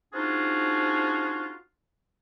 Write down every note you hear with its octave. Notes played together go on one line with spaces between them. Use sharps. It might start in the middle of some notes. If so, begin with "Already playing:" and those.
C4 D4 D#4 F4 F#4 G#4